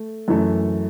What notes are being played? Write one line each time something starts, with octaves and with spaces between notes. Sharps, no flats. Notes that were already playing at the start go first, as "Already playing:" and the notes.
Already playing: A3
F#2 E3 A3